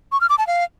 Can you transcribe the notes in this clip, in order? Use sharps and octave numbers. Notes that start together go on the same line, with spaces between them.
C#6
F6
D6
A5
F5